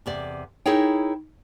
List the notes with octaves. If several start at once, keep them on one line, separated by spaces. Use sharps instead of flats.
E2 C3 D5
D#4 E4 G#4 A#4 C#5 G5